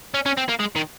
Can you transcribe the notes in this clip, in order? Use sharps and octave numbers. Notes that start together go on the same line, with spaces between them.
C#4
C#4
C4
A#3
G#3
D#3